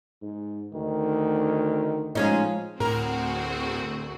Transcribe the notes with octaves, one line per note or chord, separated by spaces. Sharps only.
G#2
D2 D#3
F3 G#3 C#4 D#4
D2 A2 C4 F#4 G#4 A#4